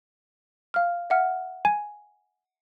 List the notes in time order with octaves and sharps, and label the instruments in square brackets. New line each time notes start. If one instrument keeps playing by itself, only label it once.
[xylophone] F5 F6
E5 F#5 F6
[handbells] G#5